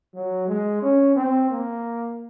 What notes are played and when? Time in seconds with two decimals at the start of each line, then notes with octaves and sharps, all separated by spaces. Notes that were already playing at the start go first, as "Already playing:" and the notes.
0.14 F#3
0.48 G#3
0.82 C#4
1.16 C4
1.51 A#3